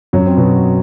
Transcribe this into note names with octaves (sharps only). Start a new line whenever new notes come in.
F#2 F#3
C4
B2 B3